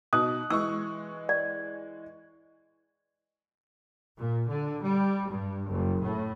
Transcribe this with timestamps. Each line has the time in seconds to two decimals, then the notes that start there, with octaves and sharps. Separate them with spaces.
0.13 B2 D#4 D#6 F#6
0.50 E3 G#3 C#6 E6
1.29 D5
4.18 A#2
4.49 D3
4.82 G3
5.31 G2
5.70 F#1
6.02 A2